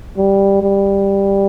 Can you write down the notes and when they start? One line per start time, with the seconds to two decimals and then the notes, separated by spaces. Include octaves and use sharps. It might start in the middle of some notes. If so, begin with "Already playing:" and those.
0.18 G3
0.62 G3